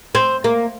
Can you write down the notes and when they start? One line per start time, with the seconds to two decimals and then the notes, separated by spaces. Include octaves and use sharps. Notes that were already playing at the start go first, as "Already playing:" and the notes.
0.15 C4
0.44 A#3